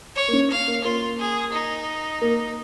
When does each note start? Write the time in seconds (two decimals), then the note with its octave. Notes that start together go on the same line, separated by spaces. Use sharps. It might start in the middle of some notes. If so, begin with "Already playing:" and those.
0.16 C#5
0.28 A#3
0.33 C#4
0.51 F5
0.68 A#3
0.84 A#3 F4
1.19 G#4
1.52 D#4
2.22 A#3